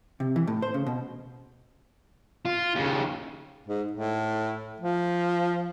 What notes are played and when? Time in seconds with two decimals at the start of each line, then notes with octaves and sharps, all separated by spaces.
0.20 C3
0.36 E3
0.47 A2
0.62 C5
0.74 C#3
0.87 B2
2.45 F4
2.75 D#2 C#3
3.67 G#2
3.91 A2
4.81 F3